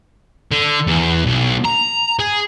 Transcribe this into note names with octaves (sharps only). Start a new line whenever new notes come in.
D3
E2
B1
A#5
G#4